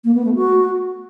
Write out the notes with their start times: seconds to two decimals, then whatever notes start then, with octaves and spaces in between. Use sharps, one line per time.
0.04 A#3
0.15 B3
0.25 A3
0.35 F#4